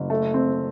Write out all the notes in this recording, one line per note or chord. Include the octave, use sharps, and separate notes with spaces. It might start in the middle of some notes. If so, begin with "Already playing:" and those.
Already playing: F#1
A3
C4